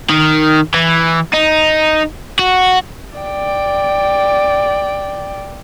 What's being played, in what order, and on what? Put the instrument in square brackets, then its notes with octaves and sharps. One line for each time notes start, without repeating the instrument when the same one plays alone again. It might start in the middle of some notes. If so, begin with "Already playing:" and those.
[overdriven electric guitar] D#3
E3
D#4
F#4
[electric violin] D5 G5